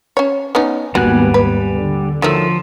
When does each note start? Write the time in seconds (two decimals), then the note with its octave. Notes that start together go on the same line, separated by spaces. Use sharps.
0.17 C#4 C#5
0.55 B3 C#4 D#4
0.95 G#1 D#2 G3 B3 F#4 G#5 F#6
1.34 B4
1.74 D3
2.22 D#3 F3 F#3 A3